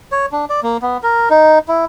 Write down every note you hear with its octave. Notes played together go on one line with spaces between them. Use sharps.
C#5
D4
D5
A#3
B3
A#4
D#4
E4